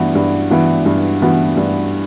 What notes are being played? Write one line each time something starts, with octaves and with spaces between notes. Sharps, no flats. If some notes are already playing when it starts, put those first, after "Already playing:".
Already playing: G2 E3 B3 F#4
G2
E3 B3 F#4
G2
E3 B3 F#4
G2